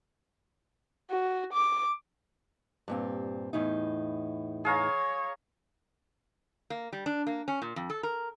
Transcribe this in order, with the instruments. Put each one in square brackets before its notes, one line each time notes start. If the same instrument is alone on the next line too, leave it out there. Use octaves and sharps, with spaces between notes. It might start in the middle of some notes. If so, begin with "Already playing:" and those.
[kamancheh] F#4
D6
[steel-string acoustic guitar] G2 A#2 C4
E2 A2 D#4
[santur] G#4 F5 A#5 [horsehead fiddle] C#5
[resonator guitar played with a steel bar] A#3
G3
D4
A#3
C#4
A#2
F2
A4
A#4